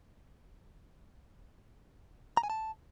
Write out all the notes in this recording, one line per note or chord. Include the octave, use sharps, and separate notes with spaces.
A#5
G#5
A5